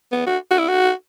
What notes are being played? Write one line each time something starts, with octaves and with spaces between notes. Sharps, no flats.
B3
F#4
F#4
E4
F#4